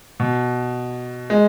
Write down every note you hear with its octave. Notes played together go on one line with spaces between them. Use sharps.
B2
G#3